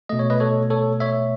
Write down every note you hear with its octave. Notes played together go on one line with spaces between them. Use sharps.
B2 A3 D#5
C#5
B4 D#5
A4 C#5
A4 C#5
C#5 E5